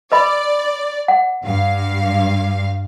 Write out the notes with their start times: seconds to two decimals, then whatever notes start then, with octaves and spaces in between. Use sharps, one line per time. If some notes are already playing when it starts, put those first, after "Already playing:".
0.12 B4 D5 D#5 B5
1.08 F#5
1.43 G2 F5